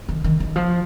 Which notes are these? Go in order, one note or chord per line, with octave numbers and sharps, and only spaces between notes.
D#3
D#3
D#3
F3